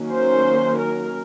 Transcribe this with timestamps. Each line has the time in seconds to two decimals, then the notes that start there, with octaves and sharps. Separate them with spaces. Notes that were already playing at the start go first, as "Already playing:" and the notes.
Already playing: D#3 F#3 A#3 C#4
0.11 C5
0.78 A#4